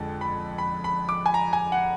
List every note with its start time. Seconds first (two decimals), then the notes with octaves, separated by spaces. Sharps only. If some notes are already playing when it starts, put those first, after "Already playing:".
Already playing: F2 D3 G#3
0.21 B5
0.58 B5
0.84 B5
1.09 D6
1.26 G#5
1.34 A#5
1.53 G#5
1.72 F#5